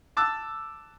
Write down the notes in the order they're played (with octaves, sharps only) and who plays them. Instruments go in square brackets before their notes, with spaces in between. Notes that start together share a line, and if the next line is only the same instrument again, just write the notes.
[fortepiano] A5 D6 E6 F#6